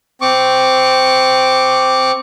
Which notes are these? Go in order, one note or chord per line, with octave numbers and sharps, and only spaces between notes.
C4 C#6 D6